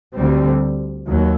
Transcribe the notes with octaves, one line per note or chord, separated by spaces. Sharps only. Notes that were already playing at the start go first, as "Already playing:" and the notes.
D2 D3 G3 C4
D#2 F#3